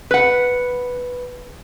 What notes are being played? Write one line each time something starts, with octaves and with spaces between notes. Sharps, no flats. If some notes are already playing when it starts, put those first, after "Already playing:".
B4 F#5